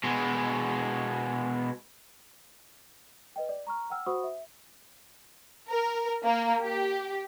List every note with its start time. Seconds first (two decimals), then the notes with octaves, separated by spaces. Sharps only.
0.04 B2 G#3
3.36 B4 D#5 G5
3.49 D5
3.67 A#5 C#6 F6
3.90 F#5 G5 E6 F6
4.06 F#4 C5 F#5 B5 C#6 D#6
4.24 E5
5.69 A#4
6.23 A#3
6.62 G4